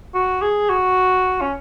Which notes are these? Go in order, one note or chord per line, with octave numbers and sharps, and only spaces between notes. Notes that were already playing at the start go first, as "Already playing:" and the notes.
F#4
G#4
F#4
C#4